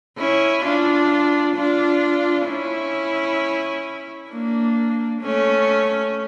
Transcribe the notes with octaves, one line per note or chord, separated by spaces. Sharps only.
C#4 E4
D4 F4
D4 F4
C#4 E4
A#3 D4
A3 C#4